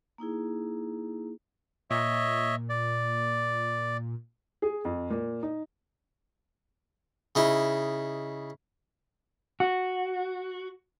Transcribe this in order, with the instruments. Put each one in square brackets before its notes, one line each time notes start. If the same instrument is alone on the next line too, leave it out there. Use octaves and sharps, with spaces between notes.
[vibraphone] A#3 D#4 E4 G#4
[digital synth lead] A#2 [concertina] C#5 D#5 E5
[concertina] D5
[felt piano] G#4
F2
A#2
D#4
[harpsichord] C#3 D#4 E4
[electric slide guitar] F#4